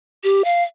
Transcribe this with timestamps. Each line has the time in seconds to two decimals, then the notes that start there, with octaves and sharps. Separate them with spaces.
0.24 G4
0.45 F5